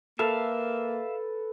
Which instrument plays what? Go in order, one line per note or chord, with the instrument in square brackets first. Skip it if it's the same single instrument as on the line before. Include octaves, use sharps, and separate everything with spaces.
[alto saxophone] A#3 [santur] A4 B4 [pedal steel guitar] E5 F5